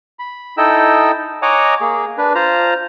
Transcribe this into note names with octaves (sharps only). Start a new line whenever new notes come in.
B5
D#4 E4 A4 D#5 G5 E6
C#5 D#5 F#5 G#5 A#5 D6
A#3 G#4
D4 B4
F4 C5 A#5